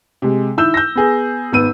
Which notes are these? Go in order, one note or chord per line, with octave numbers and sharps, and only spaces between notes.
C3 G#3
D#3 E4 E6 G6 E7
G6 A#6
B3 G#4
G#1 B3 E6 D#7